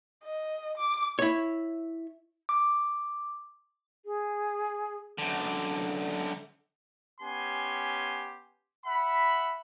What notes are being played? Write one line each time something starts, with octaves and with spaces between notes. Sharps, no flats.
D#5
D6
E4 C#5
D6
G#4
F#2 D3
B3 C#4 G4 G#5 C6
E5 F#5 B5